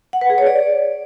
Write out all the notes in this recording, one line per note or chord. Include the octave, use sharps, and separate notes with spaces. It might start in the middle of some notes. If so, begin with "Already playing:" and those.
F#5
B4
G#4
C#5
D5